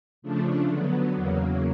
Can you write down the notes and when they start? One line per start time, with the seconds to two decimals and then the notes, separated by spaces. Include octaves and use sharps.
0.22 C#3 F3 A3 D4
0.68 D3 F#3 B3
1.13 E2 C#3 F#3 A#3